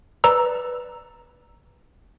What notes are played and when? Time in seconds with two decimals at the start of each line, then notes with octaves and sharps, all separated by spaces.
0.24 B4 D5 A#5 E6